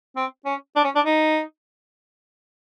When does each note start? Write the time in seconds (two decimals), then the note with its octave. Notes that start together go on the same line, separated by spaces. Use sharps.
0.16 C4
0.45 C#4
0.76 D4
0.85 C#4
0.95 D4
1.05 D#4